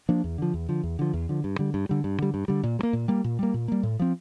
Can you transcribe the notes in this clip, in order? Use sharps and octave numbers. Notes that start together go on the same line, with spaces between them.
F3 A#3 D4
E2
D3 F3
E2
D3 F3
E2
D3 F3
E2
D3 F3
G2
D3 G3
G2
D3 G3
G2
D3 G3
G2
D3 G3
A#2
G3
A#3
A#2
G3 A#3
A#2
G3 A#3
A#2
G3 A#3
A2
F3 C4